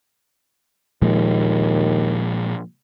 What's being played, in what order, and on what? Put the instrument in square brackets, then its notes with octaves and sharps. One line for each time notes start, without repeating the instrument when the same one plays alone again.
[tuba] D#2 [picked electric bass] A#2 F3 G#3